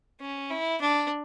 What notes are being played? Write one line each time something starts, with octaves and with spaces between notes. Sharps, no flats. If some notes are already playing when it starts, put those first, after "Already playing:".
C#4
E4
D4